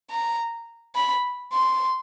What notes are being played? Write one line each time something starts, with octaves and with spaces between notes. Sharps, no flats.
A#5
B5
C6